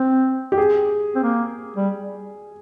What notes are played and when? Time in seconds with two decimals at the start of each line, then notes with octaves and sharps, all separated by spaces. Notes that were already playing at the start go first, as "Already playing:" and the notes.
Already playing: C4
0.52 G4
0.58 G#4
1.15 C4
1.23 A#3
1.77 G3